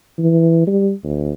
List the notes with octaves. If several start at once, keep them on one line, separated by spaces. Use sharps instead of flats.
E3
G3
D2